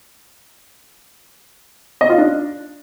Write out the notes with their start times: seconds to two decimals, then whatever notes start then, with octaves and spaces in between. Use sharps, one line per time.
2.01 D#5
2.10 F4
2.18 D4